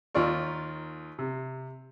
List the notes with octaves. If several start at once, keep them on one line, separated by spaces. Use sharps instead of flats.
D#2 D#3 F4 D5 C#6
C3